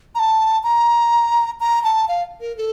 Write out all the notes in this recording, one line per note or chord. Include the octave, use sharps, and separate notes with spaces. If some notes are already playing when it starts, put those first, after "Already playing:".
A#5
A5
A#5
A#5
A5
F5
A#4
A4